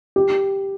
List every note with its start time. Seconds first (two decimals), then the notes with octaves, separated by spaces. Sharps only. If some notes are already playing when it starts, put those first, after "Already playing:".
0.16 G4